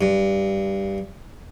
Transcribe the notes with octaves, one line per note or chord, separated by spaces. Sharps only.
G2